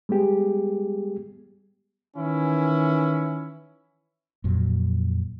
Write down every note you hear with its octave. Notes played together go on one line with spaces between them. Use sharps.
G3 G#3 B3 G4 G#4
D#3 E3 C#4 E4
F2 A#2 F#3